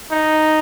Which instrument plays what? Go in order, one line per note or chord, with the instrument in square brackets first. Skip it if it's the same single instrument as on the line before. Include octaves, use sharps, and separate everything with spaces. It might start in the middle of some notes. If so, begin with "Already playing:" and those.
[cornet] D#4